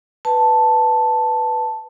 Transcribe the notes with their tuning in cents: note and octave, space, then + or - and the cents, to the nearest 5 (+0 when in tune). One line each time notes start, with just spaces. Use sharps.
B4 +0 A5 +0